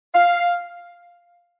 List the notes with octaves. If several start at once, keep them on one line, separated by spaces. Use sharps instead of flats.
F5